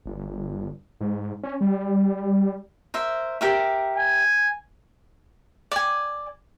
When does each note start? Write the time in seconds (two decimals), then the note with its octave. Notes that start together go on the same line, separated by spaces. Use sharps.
0.06 G1
1.01 G#2
1.43 C#4
1.61 G3
2.94 A#4 C5 E5
3.41 G4 A#4 E5
3.97 G#5
5.72 D5 G#5